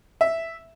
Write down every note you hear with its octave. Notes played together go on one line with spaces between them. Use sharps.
E5